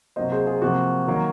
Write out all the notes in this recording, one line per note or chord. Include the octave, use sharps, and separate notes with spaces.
C3 F#3 A#3 C5 D#5
G#4 C5
F4 G#4
C3 F3 A#3 F#4
D#3 F#3 A#3